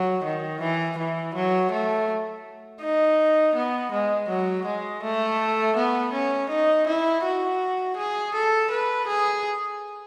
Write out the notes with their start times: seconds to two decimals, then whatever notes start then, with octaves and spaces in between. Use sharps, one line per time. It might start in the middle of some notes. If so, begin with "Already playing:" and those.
Already playing: F#3
0.24 D#3
0.61 E3
0.98 E3
1.34 F#3
1.71 A3
2.81 D#4
3.55 B3
3.92 G#3
4.29 F#3
4.66 G#3
5.03 A3
5.76 B3
6.13 C#4
6.50 D#4
6.87 E4
7.23 F#4
7.97 G#4
8.34 A4
8.70 B4
9.07 G#4